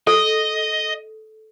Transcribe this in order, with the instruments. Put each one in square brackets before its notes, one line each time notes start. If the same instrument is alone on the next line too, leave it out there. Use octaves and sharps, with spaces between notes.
[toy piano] A4 [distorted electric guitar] D#5